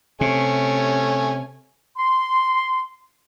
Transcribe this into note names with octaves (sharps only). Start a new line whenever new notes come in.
C3 A3 C#4 G#5
C6